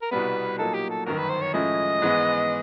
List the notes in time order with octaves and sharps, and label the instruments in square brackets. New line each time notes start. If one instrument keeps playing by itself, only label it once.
[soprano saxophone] A#4
[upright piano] C2 B2 G3 B3 [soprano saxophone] B4
[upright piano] A#2 F#3 A#3 D#4 [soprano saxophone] A4
[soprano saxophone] G4
A4
[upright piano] G1 F#2 D#3 [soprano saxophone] A#4
[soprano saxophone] B4
C5
C#5
[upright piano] A2 F3 G#3 C#4 E4 [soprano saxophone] D#5
[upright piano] G#2 E3 G#3 B3